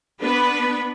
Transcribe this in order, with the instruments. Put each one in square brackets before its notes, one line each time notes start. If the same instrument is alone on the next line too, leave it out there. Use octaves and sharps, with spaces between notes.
[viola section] B3 D4 B4